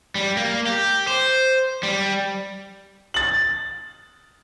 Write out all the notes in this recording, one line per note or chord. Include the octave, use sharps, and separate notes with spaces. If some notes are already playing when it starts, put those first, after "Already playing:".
G3
A#3
G4
C5
G3
A6 F#7